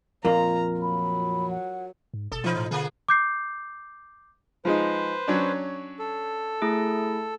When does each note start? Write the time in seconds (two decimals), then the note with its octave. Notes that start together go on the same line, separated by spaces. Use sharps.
0.25 F2 A#2 A#3 F4 A#4 A#5
0.81 F#3 B5
1.50 F#5
2.14 G#2
2.32 F#1 B2 A4
2.44 E3 F3 D#4 F4 C5 B5
2.56 A2
2.71 D3 A3 A#3 G#4
3.09 D6 G6 C7
4.65 F3 G#3 D#4 B4 C5
5.28 F#3 C#4 D4
5.99 A4
6.62 A3 E4 G#4